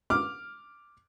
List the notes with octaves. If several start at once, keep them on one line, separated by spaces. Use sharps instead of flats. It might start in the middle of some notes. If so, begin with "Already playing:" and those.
D6 F6